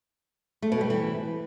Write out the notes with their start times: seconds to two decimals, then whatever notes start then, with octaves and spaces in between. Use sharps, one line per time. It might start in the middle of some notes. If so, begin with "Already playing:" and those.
0.62 A3
0.72 B2
0.81 G3
0.90 E3